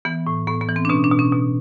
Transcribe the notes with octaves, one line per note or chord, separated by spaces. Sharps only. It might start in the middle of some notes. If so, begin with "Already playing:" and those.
E3 B3
A2
A2 B3
B3
E3
C4
D4
B2 C#4
D4
B2
C#4
B2